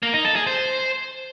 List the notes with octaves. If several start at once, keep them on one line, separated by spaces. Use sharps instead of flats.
A#3
D#4
A4
G#4
C5